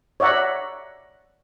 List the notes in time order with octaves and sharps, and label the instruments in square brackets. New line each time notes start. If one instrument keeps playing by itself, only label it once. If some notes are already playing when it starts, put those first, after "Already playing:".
[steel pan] C#5 D5 E5 F#5 A#5